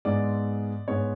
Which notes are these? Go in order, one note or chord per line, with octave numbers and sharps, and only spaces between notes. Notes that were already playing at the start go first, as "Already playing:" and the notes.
G#2 G#3 B3 D5
G#2 G#3 B3 C#5